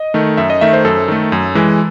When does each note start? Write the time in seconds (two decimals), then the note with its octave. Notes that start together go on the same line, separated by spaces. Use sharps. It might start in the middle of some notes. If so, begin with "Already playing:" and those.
Already playing: D#5
0.14 D#3 A3
0.37 F#2 E5
0.50 D#5
0.61 D#3 A3 E5
0.73 C5
0.85 F#2 A4
1.08 D#3 A3
1.32 F#2
1.55 E3 G#3